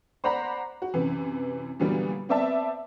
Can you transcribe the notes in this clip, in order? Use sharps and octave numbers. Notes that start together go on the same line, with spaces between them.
C5 D5 F#5 A#5 B5
F#4
F#2 C3 E3
A#2 D3 E3 F#3 G3 B3
B3 C4 B4 D5 E5 A5